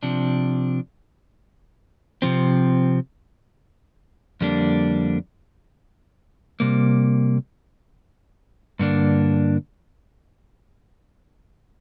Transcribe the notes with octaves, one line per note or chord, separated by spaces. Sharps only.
C3 F3 D4
C3 F3 C4
F2 D3 G3 A#3 D4
C3 G3 A#3
G2 D3 A#3 D4